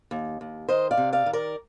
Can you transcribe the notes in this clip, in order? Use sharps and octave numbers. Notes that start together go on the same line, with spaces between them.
D#2
D#2
D#3 C5 D#5
D5 F5
C3
D5 F5
D#3
A#4 D5